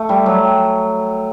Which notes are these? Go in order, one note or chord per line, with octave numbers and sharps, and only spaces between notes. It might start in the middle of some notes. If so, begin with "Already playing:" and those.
Already playing: A3
G3
F#3